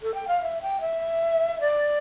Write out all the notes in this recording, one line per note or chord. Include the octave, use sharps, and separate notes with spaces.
A4
G5
F5
E5
G5
E5
D5